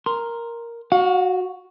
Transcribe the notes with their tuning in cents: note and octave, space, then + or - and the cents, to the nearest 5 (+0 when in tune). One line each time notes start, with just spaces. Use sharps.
A#4 +0 C6 +0
F#4 +0 F5 +40